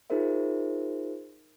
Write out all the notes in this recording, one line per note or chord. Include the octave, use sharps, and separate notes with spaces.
D#4 F4 G#4 A#4 C5 E5